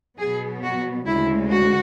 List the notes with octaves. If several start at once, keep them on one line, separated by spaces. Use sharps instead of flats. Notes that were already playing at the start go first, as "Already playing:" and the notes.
B2 F#3 B3 G#4
F#4
D2 C#3 G#3 E4
F#4